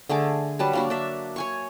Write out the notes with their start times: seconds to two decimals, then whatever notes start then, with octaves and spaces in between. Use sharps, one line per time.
0.09 D3 A3 G#4 D6
0.59 F#3 G3 B4 A5
0.73 A#3 D4 F#4
0.90 D4 E5
1.36 C#5 G#5 C#6